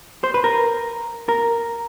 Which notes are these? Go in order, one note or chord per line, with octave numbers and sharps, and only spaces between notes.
C5
B4
A#4
A#4